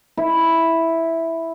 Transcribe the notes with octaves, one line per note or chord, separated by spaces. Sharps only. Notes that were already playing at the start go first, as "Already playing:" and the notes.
E4